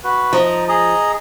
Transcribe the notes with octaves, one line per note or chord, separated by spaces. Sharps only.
F#4 B4
F3 D#4 A#5
G#4 D#5 A#5